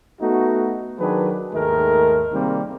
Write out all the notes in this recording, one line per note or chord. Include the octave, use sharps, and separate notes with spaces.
A3 B3 D#4 F#4
D#3 F#3 D4 G#4 B4
D#2 G#2 D#3 G#3 A3 A#4
C3 D#3 G3 G#3 A#3 C4